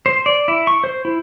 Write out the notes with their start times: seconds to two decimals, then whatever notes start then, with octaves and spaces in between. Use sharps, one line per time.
0.06 C5
0.26 D5
0.48 E4
0.67 C#6
0.84 C5
1.05 E4